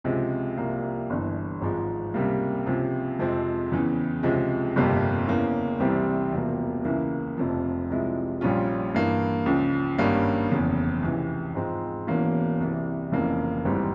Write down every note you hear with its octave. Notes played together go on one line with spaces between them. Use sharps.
C#2 C3 F3 G#3
C2 C3 F3 A#3
G1 G2 E3
G#1 G#2 F3 G#3
C#2 C3 G3 A#3
C#2 C3 F3
F2 C3 F3 G#3 C4
E2 C#3 E3
C#2 C3 F3 G#3
G1 F2 C3 G3 A#3
E2 C#3 E3 A#3 C#4
C2 C3 E3 G3 C4
E1 E2 C3 F3 A#3
C#2 C#3 E3 A#3 E4
F1 F2 C3 F3
C2 C3 F3 G#3 E4
A#1 A#2 G3 C#4 F4
G2 E3 A#3
C#2 C#3 F3
G#1 G2 G3 A#3 C#4
F1 E2 C#3
C#2 C3 E3
G#2 F3 G#3 C4
E1 E2 E3 A#3 C#4
C2 C3 E3
F1 F2 C#3 E3 A#3
G#1 G#2 E3 G3 C4